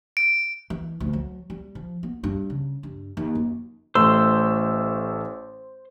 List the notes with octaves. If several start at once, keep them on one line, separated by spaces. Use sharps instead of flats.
D7
E3
D2
F#3
G3
F3
B3
G2
C#3
G2
D#2
F#2
A1 A3 C5 C6 E6